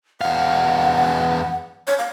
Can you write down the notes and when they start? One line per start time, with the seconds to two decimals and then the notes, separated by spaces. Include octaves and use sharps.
0.21 E2 F5 F#5
1.87 C#5
1.99 F5